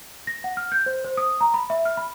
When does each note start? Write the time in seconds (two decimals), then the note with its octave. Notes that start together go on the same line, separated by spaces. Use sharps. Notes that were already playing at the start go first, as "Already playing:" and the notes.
0.27 A#6
0.44 F#5
0.57 F6
0.72 G6
0.86 C5
1.05 C5
1.17 D#6
1.41 A#5
1.54 B5
1.70 E5
1.85 F6
1.97 B5